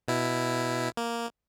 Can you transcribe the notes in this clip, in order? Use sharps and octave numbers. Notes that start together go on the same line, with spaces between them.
B2 E4
A#3